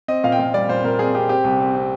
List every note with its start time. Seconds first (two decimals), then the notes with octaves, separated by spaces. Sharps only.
0.08 C4 D#5
0.24 A#2 F5
0.32 G5
0.39 A#2 F5
0.54 G3 D5
0.69 A#2 C5
0.84 A#2 A#4
0.99 C4 G#4
1.15 C4 G4
1.29 C4 G4
1.44 C2
1.60 C4
1.75 C4